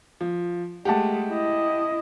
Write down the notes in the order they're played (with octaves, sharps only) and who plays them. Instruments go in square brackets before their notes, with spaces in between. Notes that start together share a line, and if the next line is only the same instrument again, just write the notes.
[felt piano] F3
[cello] G#3 A3 [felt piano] G4 F#5 A5
[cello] E4 D#5